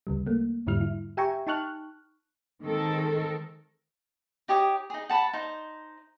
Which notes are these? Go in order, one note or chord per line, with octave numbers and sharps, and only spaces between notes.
D2 C#3 G3
A3 A#3
E2 G#2 D3 G3 E4 F6
E4
G4 E5 G5 G#5 A#5 C#6
D#4 G5 A5 C#6 F6 F#6
D#3 G#3 C4 A4 A#4
D#4 G4 C#5 D#6
D#4 G#4
F#5 A5 B5
D#4 C5